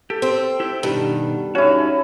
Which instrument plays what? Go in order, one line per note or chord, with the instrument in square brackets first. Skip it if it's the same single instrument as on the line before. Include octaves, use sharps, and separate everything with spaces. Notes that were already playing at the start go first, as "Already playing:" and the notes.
[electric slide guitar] G4 [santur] A4
[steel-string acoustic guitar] C4
[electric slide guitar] E4 G4
[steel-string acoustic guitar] G2 [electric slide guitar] B2 D#3
[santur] C#4 E4 [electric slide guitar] D#4 F#4